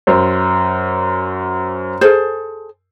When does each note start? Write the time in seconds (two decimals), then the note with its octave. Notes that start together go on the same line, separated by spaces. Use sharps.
0.07 F#2 C5
2.01 G#4 A4 C5